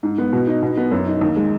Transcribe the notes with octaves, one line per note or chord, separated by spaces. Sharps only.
G#2
B3
B2
D#4
B2
B3
F#2
D#4
D#2
G#3